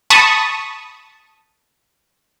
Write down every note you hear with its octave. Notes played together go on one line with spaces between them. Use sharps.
A5 B5 C#6 D#6